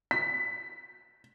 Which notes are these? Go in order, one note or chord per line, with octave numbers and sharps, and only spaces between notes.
B6